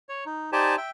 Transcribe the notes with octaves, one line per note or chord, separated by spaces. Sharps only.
C#5
D#4
D#4 G4 C5 D5 G#5 A5
E5 G5